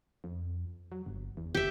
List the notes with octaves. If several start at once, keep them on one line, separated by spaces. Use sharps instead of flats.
F2
F#3
G1
E2
F#1 G4 E5